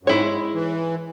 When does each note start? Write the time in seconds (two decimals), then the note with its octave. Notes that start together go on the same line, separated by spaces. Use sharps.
0.03 F#2
0.07 G#2 G#3 E4 C#5
0.54 E3